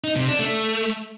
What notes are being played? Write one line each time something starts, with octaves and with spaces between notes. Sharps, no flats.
D#4
C3
D4
A3